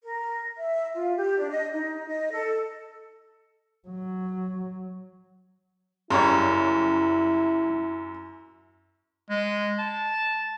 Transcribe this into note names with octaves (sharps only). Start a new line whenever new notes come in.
A#4
E5
F4
G4
D4
D#5
D#4
D#5
A4
F#3
F#2 C#3 G3 E4 C#5 A#5 C6
G#3
A5